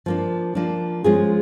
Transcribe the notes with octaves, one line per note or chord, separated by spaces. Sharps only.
F3 A#3 D4
F3 A#3 D4
F3 G#3 C#4 F4 G#4